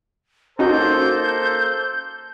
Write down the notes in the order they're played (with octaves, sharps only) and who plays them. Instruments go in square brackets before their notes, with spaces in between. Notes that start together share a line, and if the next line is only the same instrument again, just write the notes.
[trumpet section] A#3 A4 C5 [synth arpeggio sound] C#4 D#4 F#4 [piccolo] G6